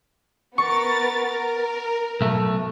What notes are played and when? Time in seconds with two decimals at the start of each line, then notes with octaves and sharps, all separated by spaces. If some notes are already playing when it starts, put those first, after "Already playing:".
0.58 B3 A#4 C#6 A6
1.29 A#4
2.21 B1 A3